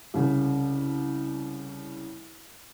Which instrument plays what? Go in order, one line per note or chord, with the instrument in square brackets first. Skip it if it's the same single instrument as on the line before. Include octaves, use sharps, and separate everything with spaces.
[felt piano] C2 C#3